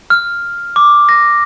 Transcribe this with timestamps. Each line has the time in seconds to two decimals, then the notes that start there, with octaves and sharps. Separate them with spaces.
0.10 F6
0.76 D6
1.09 A#6